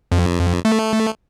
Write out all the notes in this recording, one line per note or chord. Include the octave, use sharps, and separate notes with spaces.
F2
A3